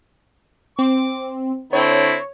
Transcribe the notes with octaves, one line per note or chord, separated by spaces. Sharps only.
C4 D6
D3 C4 E4 C#5